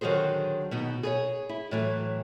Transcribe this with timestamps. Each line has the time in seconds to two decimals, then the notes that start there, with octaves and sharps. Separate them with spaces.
0.01 D3 D#3 F#3 F#4 G#4 C5
0.71 B2 B3 D#4
1.03 G#4 A#4 C#5
1.49 E4
1.71 A2 E3 F#3